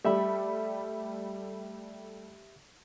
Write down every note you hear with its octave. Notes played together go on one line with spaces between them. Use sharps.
G3 A3 G4 E5 B5